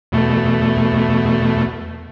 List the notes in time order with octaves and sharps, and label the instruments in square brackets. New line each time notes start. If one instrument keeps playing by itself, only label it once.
[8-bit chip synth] E2 B2 A3